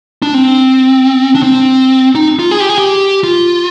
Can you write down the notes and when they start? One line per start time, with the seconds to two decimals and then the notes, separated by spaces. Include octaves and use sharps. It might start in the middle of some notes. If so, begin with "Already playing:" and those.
0.22 D4
0.34 C4
1.35 D4
1.43 C4
2.15 D#4
2.39 F4
2.51 G#4
2.60 G4
2.69 G#4
2.78 G4
3.23 F4